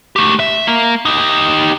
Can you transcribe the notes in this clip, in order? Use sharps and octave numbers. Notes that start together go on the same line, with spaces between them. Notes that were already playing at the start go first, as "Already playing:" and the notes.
A3 G4
E5
A#3
D#4 G4